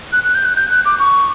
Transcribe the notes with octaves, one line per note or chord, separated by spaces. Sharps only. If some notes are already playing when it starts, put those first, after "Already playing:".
F#6
F#6
G6
F#6
G6
F#6
D6
C#6